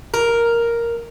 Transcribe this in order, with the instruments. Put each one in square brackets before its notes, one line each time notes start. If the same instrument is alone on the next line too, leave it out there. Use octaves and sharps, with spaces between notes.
[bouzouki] A#4